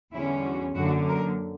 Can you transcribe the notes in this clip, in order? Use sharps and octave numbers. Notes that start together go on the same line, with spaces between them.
E2 D3 G3 C#4 E4
F#4
F#2 D3 A#3 F#4
A#4